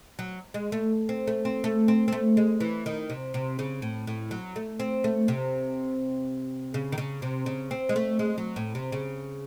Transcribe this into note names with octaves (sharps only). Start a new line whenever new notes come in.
F#3
G#3
A3
C4
A3
C4
A3
C4
C4
A3
G#3
E3
D#3
C3
C3
C#3
A2
A2
F#3
A3
C4
A3
C3
C#3
D#3
C#3
C3
C#3
C4
G#3
A3
G#3
F#3
A2
C3
C#3